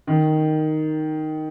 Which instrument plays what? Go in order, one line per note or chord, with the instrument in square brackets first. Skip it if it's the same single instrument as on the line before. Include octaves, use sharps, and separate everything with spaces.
[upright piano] D#3